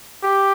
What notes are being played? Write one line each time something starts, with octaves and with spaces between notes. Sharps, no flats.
G4